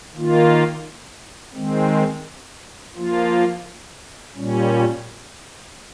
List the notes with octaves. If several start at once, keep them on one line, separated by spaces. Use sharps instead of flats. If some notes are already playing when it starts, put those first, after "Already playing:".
D#3 A#3 F4
D#3 G#3 C4
F3 A#3 F4
A#2 G3 C#4